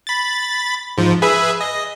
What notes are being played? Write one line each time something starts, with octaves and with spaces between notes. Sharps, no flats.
B5 A6
G#2 F3
G#4 B4 E5
D#5